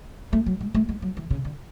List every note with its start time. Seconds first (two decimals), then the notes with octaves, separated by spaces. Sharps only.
0.33 A3
0.46 F#3
0.61 G#3
0.75 A3
0.89 G#3
1.02 F#3
1.17 E3
1.30 C#3
1.45 D3